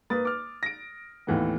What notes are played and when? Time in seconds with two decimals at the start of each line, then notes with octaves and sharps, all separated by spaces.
0.10 A#3 B4 D#6 A6
0.25 D6 F6
0.63 A#6 D7
1.27 D#2 A2 E3 A3 B3